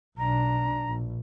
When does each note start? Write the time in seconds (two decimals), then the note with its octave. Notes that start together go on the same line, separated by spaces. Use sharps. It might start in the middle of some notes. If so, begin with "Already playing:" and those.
0.18 B1 D4 A#5
0.88 A#1